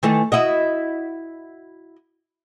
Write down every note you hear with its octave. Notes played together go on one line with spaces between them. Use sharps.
D#3 E3 A3
E4 F#4 D#5